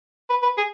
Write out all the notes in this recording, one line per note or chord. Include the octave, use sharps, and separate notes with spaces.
B4
B4
G#4